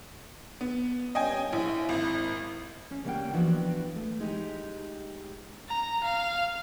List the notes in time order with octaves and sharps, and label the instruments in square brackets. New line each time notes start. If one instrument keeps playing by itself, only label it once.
[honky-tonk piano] B3
[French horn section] G2 A#2 C#4 [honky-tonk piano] D#5 G5 G#5
[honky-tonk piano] A#1 [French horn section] E4
[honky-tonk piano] G#1
[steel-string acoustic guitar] C#4
C#3 G3 A#3 D#5 F#5 G5
E3 F3 B3 D4 F#4
A3
G#3 D#4 G4
[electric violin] A#5
F5